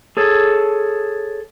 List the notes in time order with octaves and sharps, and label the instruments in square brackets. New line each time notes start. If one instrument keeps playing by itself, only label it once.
[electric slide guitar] G#4 A4 C#5